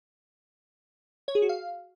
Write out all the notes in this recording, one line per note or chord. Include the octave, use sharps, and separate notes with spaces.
C#5
G#4
F#4
F5